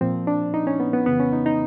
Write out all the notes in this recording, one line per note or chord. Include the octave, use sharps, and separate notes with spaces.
A#2 F3 C4
D4
D#4
C#4
B3
B3
F2 C#3 E3 B3
C#4
D#4
D#4